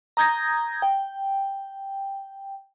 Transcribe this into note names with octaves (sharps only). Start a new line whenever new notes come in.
A#5 D#6 G6 G#6 A#6
G5